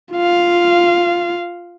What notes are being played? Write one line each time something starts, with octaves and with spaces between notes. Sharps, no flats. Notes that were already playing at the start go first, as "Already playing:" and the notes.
F4 F5